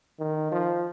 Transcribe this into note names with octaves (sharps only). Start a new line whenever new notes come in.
D#3
F3